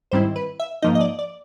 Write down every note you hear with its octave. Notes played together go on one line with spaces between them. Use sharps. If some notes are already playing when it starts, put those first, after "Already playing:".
G#2 D#3 G3 C4 E4 C5
B4
E5
G#2 F3 A#3 D#4 D#5
D#5
D5
D5